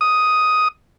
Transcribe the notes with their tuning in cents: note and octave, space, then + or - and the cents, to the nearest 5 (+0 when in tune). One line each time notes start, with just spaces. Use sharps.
D#6 +5